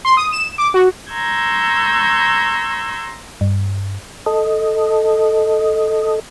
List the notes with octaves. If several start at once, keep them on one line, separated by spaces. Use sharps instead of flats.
C6
D#6
E7
D6
F#4
A#5 C6 C#6 E6 G6 G#6
G2
A4 D#5